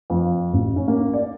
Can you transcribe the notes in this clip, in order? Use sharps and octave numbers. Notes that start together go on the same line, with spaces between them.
F2
A1
C#4
A#3
D5